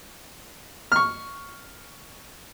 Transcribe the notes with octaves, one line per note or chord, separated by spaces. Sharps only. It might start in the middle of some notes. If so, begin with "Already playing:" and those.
C#6 F6